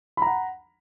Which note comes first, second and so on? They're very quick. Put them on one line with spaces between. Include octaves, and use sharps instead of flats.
B5 A#5 F#5